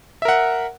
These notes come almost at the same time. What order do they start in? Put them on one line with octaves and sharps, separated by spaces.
E5 A#4 F#5